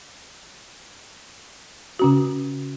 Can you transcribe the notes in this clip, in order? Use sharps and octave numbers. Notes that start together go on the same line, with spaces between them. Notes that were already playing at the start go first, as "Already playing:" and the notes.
C#3 C#4 F#4